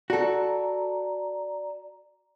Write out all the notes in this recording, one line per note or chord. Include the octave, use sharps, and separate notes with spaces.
F#4 A4 D5 A#5